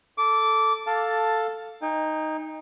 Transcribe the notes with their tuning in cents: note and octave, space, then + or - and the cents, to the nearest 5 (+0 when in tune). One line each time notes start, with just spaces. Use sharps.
A4 +0 D6 -15
A4 +0 F5 +5 A5 +5
D#4 +0 G5 +40